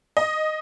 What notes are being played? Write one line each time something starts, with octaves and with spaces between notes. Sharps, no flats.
D#5